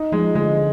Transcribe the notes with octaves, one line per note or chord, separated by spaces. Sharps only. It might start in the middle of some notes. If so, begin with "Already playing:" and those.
Already playing: D#4
F3 G#3
D3 G#3